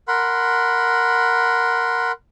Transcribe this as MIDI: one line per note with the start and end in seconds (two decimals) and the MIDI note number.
0.08 2.12 70
0.08 2.12 78
0.08 2.12 83
0.08 2.12 84